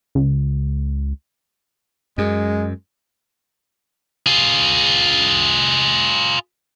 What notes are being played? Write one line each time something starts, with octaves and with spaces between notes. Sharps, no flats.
C#2
F#2 G#3
F4 G#4